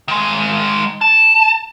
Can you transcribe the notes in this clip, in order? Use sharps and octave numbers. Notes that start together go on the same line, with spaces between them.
D#3 G#3
A5